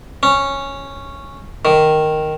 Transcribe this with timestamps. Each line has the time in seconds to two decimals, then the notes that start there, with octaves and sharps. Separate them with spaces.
0.23 C#4
1.65 D#3